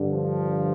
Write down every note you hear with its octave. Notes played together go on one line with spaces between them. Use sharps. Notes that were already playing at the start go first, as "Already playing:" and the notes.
Already playing: G2 D3
F3